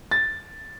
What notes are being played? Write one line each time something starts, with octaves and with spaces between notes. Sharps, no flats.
A6